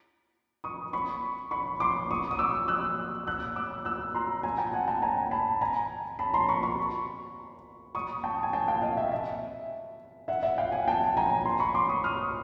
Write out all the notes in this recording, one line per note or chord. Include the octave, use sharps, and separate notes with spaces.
C#6 D#6
B5 C#6
B5 C#6
C6 D6
C#6 D#6
D#6
D6 E6
E6 F#6
E6 F#6
D6 E6
E6 F#6
A#5 C6
G#5 A#5
G5 A5
F#5 G#5
G5 A5
G#5 A#5
A5 B5
G#5 A#5
A5 B5
A#5 C6
B5 C#6
B5 C#6
C#6 D#6
G5 A5
G#5
G5 A5
F5 G5
D#5 F5
E5
E5
E5 F#5
E5 F#5
F5 G5
F#5 G#5
G5 A5
G#5 A#5
A#5 C6
B5 C#6
C6 D6
C#6 D#6
D#6 F6